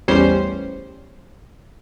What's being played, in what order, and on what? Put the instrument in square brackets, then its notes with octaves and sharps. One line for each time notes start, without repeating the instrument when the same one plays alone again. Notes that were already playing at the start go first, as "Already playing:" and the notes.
[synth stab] A1 E2 G3 C#4 C5 C7